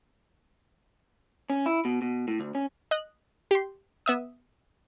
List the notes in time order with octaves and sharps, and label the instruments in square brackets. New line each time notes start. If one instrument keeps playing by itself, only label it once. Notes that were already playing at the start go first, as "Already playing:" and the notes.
[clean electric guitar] C#4
E4
B2
B2
A2
D2
C#4
[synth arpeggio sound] D#5 F#6
G4 C6
B3 E5 D#6